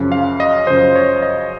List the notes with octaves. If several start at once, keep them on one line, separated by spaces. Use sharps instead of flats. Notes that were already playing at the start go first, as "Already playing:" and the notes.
Already playing: F#2 C#3 F3
F5
D#5
F#2 C#3 F3 C5
C#5
D#5